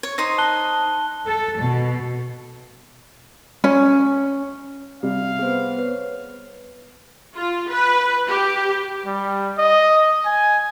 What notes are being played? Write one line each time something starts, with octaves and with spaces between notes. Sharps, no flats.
C#5
D#4 C5 D#6
A5 F#6 G7
A4
B2
C#4
C3 G3 F5
B3 G#4 C5
B4 C#5
F4
B4
G4
G3
D#5
G#5